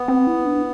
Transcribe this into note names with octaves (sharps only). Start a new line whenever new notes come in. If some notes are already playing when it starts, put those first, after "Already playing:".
Already playing: B3
C4
E4
D4